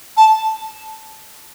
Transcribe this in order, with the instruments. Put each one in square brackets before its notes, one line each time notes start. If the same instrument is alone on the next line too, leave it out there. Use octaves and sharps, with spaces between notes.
[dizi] A5